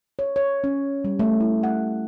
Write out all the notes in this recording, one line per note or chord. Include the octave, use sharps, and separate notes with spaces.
C#5
C#5
C#4
G3
A3
E4
F#5